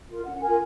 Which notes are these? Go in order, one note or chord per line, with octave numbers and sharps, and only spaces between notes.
F4 A#4
C#4 F#5
F4 A#4 G#5